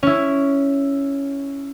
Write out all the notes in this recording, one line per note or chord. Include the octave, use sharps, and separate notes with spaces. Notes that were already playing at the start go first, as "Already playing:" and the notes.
C#4 E4